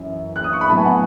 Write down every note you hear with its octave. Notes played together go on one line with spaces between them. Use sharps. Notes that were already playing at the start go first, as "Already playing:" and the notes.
Already playing: F#2 E3 C#4
F#6
D#6
C#6
B5
A2 F#3 B3 A5
G#5
F#5